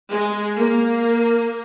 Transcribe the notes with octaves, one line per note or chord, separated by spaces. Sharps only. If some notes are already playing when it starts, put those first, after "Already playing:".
G#3
A#3